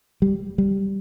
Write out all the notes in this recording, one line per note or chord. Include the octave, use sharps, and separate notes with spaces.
G3
G3